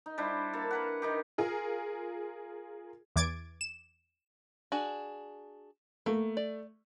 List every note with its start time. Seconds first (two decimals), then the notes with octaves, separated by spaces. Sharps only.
0.06 D#4
0.18 G3 D4 E4 C5
0.53 A#3 D4 A4
0.71 A#4 B4 F#5
1.02 D#3 D#4 G4
1.38 F4 G#4 A#4
3.16 E2 E3 D6 G#6 A6 D7
3.61 E7
4.72 D4 F#4 G#4
6.06 A3 A#3
6.37 D5